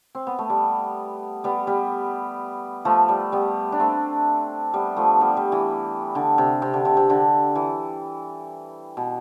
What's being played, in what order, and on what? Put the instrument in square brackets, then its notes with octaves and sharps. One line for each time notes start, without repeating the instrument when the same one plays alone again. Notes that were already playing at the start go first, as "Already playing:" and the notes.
[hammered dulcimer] C4
B3
A3
G3
G3 B3
G3 B3
F3 A3
G3
G3 B3
D4
A3 C4
G3 B3
F3 A3
G3 B3
G3
E3
D3
C3
C3
D3
C3
C3
D3
E3
B2